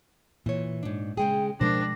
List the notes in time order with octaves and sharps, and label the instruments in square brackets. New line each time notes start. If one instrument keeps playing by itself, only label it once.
[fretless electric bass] A#2 [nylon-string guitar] E3 C#5
[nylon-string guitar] G#2 D4
[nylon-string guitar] C#3 G#3 G#4 [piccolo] G5
[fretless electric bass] B2 F3 G#3 [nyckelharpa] D4 [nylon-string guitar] A#4 C5 [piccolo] A#6